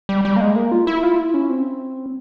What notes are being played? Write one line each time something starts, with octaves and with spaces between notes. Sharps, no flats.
G3
G3
A#3
G#3
A#3
F4
E4
F4
E4
C#4
C4